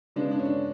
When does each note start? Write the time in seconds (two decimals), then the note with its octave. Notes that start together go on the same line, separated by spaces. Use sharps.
0.16 C#3 G#3 B3 D4
0.31 D4
0.39 C#4
0.45 D4